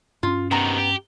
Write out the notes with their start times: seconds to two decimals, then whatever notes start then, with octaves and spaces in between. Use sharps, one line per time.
0.23 G2 C#4 F4
0.51 C3 D#3 B3 A#5
0.78 G4